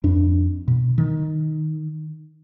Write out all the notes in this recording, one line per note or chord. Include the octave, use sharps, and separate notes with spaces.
F2 D4
B2
D#3